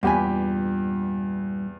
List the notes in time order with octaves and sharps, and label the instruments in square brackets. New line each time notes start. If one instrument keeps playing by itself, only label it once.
[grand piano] E2 G4 B5 [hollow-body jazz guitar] G2 A#2 G#5